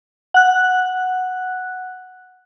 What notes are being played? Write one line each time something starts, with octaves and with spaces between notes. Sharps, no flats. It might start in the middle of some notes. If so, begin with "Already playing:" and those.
F#5 F#6